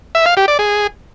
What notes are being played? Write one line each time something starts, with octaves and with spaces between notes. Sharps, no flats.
E5
F5
G4
D5
G#4